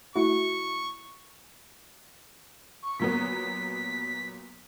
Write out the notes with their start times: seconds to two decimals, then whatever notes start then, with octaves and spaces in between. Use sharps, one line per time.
0.16 A3 E4 F#4 C#6
2.82 C#6
3.00 A#2 F#3 B3 B6